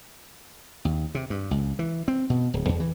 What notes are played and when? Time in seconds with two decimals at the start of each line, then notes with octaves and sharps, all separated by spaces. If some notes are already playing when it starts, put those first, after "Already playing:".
0.85 D#2
1.15 C3
1.30 G2
1.51 C#2
1.79 E3
2.08 C4
2.30 B2
2.54 D1
2.69 E2
2.80 E3